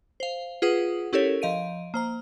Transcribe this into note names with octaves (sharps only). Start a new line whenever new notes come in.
C5 F5
F4 G#4 B4 F#5 D#6
C#4 E4 G4 A4 A#4 C#5
F3 D#5 F5 D7 D#7
A#3 C5 A#5